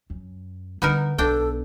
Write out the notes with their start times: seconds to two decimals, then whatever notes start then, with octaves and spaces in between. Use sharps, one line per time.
0.10 F#2
0.82 D3 G3 B3 D#4 A#4
1.18 B1 B3 D4 A4 G5